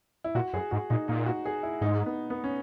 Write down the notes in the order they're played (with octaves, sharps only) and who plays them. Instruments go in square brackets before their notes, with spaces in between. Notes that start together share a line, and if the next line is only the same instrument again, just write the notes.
[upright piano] E4
[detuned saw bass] A#2 [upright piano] F#4
[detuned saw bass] F#2 [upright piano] G#4
[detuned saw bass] G#2 [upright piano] F#4
[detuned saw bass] A#2 [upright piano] D#4
[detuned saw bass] A#2 [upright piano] D#4
[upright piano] F#4
G#4
E4
[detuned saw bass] G#2 [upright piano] D#4
[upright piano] B3
B3
C#4